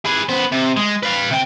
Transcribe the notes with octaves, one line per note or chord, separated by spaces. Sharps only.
G#4 B4
B3 C5
C3
G#3
B4 F5
C3 G5